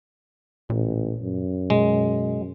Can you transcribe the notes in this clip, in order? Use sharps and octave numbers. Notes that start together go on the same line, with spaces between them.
A1 A#2
F#2
B2 G#3